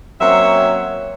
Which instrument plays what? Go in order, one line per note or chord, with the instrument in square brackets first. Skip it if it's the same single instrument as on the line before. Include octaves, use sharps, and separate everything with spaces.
[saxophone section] F#3 A#3 C4 C#4 C#5 E5